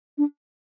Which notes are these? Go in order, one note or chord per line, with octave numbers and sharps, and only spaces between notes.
D4